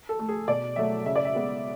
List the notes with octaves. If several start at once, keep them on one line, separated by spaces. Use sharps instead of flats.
A4
A3
G#4
B2 D5
F#3 A3 E5
C#3 E5
D5
E5
G#3 B3